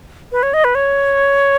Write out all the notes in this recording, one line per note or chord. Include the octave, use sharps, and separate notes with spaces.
B4
C#5
D#5
B4
C#5